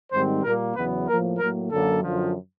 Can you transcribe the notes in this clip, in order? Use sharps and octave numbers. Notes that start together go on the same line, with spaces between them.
G#2 D#3 G3 C4 C5
A#2 G3 A#3 A#4
E2 C#3 F#3 B3 B4
A2 F3 A#3 A#4
A2 F#3 A#3 A#4
F#2 D3 F#3 A#3 A4
F#2 D3 F3